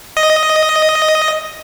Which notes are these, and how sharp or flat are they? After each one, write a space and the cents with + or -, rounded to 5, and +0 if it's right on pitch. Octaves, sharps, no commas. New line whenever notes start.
D#5 +5